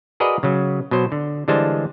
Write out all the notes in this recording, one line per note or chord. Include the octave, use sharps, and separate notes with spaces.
F#4 G#4 A#4 B4 D5 D#5
C#3 F#3
B2 F#3 C5
D3
D3 E3 G3 G#3 C5 A5